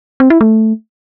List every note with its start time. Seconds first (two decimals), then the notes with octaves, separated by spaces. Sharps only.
0.20 C4
0.30 E4
0.41 A3